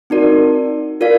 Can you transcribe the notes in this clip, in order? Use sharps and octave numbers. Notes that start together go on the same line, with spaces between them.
C4 D#4 F#4 A#4 D5
F4 A#4 D5 F5